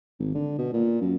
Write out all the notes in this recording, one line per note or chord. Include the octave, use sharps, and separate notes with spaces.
G#1
D3
B2
A#2
F#2